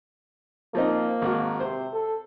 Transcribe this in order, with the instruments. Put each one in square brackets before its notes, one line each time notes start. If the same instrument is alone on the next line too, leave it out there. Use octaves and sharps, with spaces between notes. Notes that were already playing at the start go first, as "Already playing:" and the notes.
[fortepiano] F3 C4 D#4 [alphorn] A#3
[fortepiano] G#1 F#4
[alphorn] C3 [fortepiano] C5
[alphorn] A4